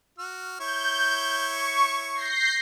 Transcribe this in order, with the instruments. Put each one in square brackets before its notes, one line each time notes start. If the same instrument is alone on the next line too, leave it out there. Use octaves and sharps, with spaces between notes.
[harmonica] F#4 F6
[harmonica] E4 C#5 [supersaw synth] G6
[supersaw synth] C#6
G6 A#6 C7